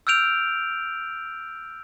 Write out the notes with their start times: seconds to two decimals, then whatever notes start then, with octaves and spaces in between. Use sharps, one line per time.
0.07 E6 F6 G6 D7 F7